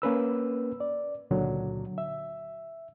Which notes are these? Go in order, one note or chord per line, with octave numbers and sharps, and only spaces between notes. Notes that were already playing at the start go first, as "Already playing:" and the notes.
A#3 C#4 B4 E6
D5
C#2 A#2 D3 F#3
E5